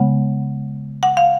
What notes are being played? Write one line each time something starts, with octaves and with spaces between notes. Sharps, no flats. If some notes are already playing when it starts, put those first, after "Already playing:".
Already playing: C#3 G#3 B3 F#5
F#5
F5